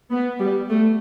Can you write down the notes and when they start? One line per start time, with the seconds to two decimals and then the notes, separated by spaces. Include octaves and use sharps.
0.11 B3
0.40 G3
0.69 A3